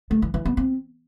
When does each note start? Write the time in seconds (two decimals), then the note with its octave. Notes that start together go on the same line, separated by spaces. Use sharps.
0.11 A3
0.22 E3
0.34 E3
0.46 B3
0.57 C4